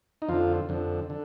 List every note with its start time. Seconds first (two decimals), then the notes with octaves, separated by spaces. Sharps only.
0.22 D#4
0.29 F2 D3 F4
0.69 F2 D3
1.10 D3